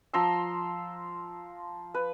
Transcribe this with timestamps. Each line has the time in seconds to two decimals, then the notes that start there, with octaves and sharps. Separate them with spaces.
0.13 F3 A#5 C6 E6
1.94 B4